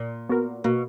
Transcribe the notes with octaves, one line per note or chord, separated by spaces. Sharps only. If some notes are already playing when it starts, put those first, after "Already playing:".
Already playing: A#2
B3 F#4 A#4
B2 A#3